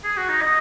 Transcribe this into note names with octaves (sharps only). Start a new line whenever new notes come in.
G#4
F#4
D#4
D#5